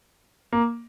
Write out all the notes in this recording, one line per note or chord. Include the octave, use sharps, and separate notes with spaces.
A#3